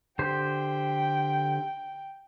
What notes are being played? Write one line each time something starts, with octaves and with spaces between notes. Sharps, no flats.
D3 G4 C5 G5